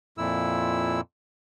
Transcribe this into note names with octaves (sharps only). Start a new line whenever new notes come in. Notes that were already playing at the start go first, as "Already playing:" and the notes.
F2 A#2 E4 E6